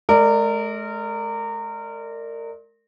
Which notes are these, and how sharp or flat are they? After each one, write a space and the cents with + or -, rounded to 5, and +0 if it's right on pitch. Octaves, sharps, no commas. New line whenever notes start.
G#3 +40 A#4 -25 D5 +0